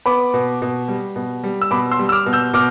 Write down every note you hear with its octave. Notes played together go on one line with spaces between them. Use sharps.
B3 B5 D6
B2
B2
G3
B2
G3
E6
B2 B5 D6
C6 E6
G3
E6
D6 F6
B2
E6 G6
B2 D6 F6